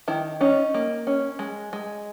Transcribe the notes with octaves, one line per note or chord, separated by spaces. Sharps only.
D#3 E4
C#4 D#4
A#3
C#4
G#3
G#3